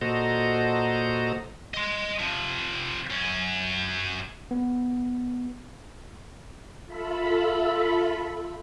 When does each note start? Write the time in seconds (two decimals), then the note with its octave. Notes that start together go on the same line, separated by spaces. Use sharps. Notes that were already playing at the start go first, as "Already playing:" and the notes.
0.01 A#2 F#4 A4 C5 D#5 A#5
1.74 D#5 C6
2.19 C3 F3
3.10 F#2 C#4
4.51 B3
6.86 F4 A4 E5 B5